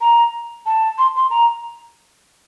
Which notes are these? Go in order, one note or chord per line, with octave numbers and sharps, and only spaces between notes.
A#5
A5
C6
C6
A#5